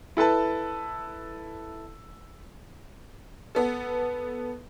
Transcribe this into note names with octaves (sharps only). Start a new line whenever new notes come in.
E4 A4 B4 A5
B3 A4